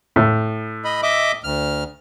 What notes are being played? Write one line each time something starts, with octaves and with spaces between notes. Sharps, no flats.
A2
D#5 B5
D#5 E5 D6
D2 F6